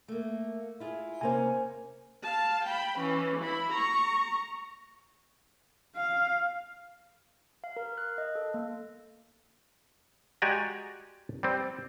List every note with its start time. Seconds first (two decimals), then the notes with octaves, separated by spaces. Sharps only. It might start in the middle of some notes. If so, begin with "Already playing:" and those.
0.08 A3 A#3
0.80 E4 F4 G#4
1.21 C3 A#3 C#4 C5 G#5
2.23 F5 A5
2.65 G5 B5
2.99 E3 C#4
3.39 E4 B5
3.73 A#5 C#6
5.96 F5
7.64 F5
7.76 A#4
7.98 F#6
8.18 D#5
8.35 A4
8.54 A#3
10.42 G#3 F#4 G4 D5 G#5 A#5
11.43 G3 C4